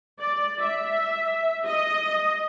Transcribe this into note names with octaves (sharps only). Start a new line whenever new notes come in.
D5
E5
D#5